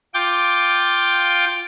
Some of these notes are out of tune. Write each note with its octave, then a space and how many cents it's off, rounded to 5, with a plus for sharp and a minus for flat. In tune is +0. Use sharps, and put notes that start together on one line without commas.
F4 +5 G5 +0 D6 +0